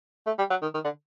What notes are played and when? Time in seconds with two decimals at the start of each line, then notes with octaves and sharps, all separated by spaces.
0.27 A3
0.39 G3
0.50 F#3
0.62 D#3
0.74 D#3
0.84 D3